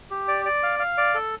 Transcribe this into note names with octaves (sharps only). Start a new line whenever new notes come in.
G4
D5
D5
F5
F5
D5
A4